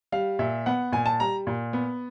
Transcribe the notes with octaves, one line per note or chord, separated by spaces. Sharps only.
G3 F5
A#2 E5
B3 F#5
A#2 G#5
A5
G3 A#5
A#2
B3